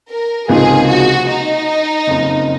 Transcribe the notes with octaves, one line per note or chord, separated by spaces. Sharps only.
A#4
C#2 C3 F3 A#3 D#4 G#4
F#4
D#4
F#1 F2 C#3